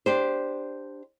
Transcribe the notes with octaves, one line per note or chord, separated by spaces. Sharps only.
D4 G4 C5